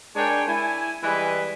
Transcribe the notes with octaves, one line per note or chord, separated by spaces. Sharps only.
G#3 D4 A#4 C#5 G5 G#5
E4 G#5
E3 G3 G#3 B4